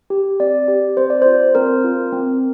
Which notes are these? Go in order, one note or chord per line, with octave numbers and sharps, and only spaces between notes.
G4
C4 D5
G4
C4 C5
D5
F4 C5
C4 A#4
F4
C4